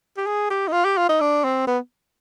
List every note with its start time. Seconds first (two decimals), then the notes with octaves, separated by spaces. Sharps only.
0.17 G4
0.26 G#4
0.50 G4
0.68 D#4
0.73 F4
0.84 G4
0.97 F4
1.09 D#4
1.21 D4
1.44 C4
1.67 B3